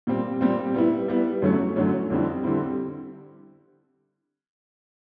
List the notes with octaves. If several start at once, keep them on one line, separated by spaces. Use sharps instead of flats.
A#2 G3 C4
A#2 G3 C4
G3 B3 E4
G3 B3 E4
F#2 D3 F#3 A3 C#4
F#2 D3 F#3 A3 C#4
F2 D3 G3 C4 E4
D3 G3 C4 E4